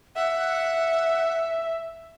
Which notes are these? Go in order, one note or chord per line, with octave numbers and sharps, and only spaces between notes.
E5 F#5